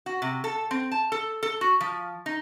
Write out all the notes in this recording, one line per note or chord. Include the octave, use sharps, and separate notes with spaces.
F#4
C3
A4
C4
A5
A4
A4
F#4
F3
D#4